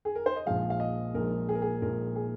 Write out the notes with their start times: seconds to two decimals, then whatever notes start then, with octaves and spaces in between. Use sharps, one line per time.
0.05 G#4
0.15 A#4
0.26 C5
0.36 D#5
0.46 A#1 A#2 F3 G#3 F5
0.70 F5
0.80 D#5
1.14 A#1 A#2 F3 G#3 A#4
1.49 G#4
1.55 A#4
1.62 G#4
1.82 A#1 A#2 F3 G#3 A#4
2.16 G#4